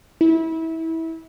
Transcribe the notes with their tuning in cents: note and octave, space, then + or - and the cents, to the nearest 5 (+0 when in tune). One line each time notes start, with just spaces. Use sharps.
E4 -25